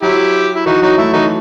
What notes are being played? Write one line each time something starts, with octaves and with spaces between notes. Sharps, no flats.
F#3 E4 G4
E4
E3 D#4 F#4
F#3 D#4 F#4
A3 E4
E3 D#4 F#4